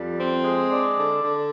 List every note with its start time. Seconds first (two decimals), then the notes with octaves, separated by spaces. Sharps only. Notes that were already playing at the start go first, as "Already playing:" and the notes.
Already playing: F2 G3
0.19 C4
0.44 G#3
0.70 D4
0.96 D3
1.21 D3